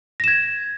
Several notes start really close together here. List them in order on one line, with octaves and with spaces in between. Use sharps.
A#6 E7 G#6